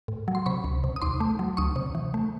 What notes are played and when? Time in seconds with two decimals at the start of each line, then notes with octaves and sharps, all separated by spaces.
0.08 A2
0.28 F#3
0.35 C6
0.46 C3 B5 C#6
0.64 C#2
0.84 C3
0.96 D#6
1.02 D#2 C6 D6
1.20 A3
1.39 F#3
1.57 D2 C#6 D#6
1.76 C3
1.95 E3
2.14 A3